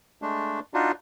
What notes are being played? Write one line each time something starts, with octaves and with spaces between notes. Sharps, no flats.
G#3 A3 D4
D4 D#4 F4 F#4